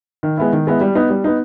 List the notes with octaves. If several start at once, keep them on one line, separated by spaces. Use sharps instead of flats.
D#3
G#3 B3 E4
D#3
G#3 B3 E4
G3
B3 D#4
G3
B3 D#4